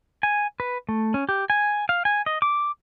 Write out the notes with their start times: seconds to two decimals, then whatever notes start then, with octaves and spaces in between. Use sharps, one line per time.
0.23 G#5
0.60 B4
0.89 A3
1.14 C#4
1.29 G4
1.50 G#5
1.89 F5
2.05 G#5
2.26 D#5
2.42 D6